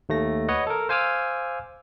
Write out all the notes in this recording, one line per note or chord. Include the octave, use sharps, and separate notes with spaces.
D#2 A3 A#6
B4 C#5 D#5 F#5
A4 A#4
C5 F5 G#5 D6 E6 F6